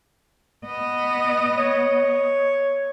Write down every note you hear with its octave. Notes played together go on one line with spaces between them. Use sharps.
B3 D#5
C#5